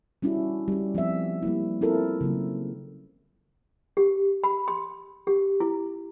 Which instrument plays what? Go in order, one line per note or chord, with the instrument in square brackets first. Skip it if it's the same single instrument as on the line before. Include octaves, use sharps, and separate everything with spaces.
[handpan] G3 C#4 D4 E4 F#4
G3 C#4
F3 B3 C4 E5
G3 A#3 E4
C4 E4 F4 A4 A#4
C#3 F#3 A#3
[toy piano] G4
B5
C6
G4
E4